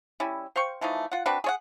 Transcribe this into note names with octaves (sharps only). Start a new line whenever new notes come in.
G3 C#4 E4
C5 F5 G5 C#6
E3 F3 A3 D#4
F4 F#5
C4 D4 F#4 B4
G#4 C#5 F#5